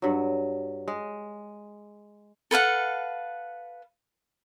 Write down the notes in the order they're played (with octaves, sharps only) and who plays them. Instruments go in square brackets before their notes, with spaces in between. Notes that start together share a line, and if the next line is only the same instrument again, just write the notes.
[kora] G2 F#3
G#3
[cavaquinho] A4 B4 F5 F#5